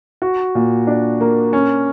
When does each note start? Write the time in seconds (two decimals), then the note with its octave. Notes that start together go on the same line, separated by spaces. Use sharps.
0.22 F#4
0.55 A#2
0.87 D4
1.21 A#3
1.53 C#4